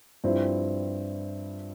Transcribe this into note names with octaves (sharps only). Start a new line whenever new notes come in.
G2 F3 C4 E4